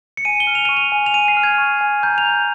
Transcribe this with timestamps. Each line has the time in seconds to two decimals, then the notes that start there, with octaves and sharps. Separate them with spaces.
0.17 C#7
0.25 G#5 D#7
0.40 G7
0.47 F6
0.55 F7
0.65 C#6 D#7
0.77 F7
0.92 G#5
1.06 F7
1.14 G#5 D#7
1.28 C7
1.37 F6
1.43 G#6
1.58 C#6
1.81 G#5
2.03 A#5 G6
2.18 F7
2.25 G6